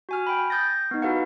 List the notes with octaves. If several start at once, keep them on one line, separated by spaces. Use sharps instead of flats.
F#4 G#5 F6
G5 B5
D#6 G6 A6 A#6
B3 D#4
E4 F#4 A4 B4 F5 F#5